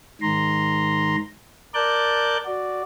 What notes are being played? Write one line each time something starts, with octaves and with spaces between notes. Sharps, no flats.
G#2 D#3 A#5 C6
A#4 D5 A5 D6 F#6 G6
F#4 D5